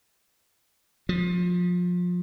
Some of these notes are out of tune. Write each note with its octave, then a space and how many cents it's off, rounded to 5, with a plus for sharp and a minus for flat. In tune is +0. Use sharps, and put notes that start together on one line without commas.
F3 +25